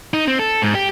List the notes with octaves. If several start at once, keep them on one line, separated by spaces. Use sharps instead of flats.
D#4
C4
A4
G#2
G4